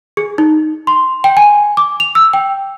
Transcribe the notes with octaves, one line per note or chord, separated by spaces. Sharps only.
G#4
D#4
C6
G5
G#5
D6
F7
E6
G5